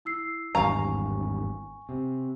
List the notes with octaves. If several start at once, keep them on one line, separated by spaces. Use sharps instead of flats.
E4 E6 C7
G#1 E2 G2 F5 G#5 A#5 C#6
C3